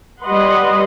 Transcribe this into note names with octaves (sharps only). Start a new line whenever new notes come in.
G3 B4 D#5 F#5 C6